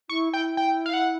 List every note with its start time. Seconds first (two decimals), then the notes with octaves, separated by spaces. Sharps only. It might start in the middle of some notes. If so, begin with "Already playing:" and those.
0.09 E4 C#6
0.33 E4 G5
0.57 G5
0.86 F5
0.93 F#5